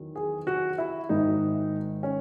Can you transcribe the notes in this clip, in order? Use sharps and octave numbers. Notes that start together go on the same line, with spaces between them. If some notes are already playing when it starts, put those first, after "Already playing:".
Already playing: E2 D#3 F#3
G#4
F#4
E4
G#1 G#2 D#3 D#4
C#4